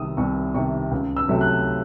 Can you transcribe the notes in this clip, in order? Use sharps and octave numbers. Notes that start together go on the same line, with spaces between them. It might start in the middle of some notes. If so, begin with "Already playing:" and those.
Already playing: C2 C3 D#3 D#6 E6
C2 C#6
C3 D#3 C#6
C#2
E6
C3 F#3 A3
F#6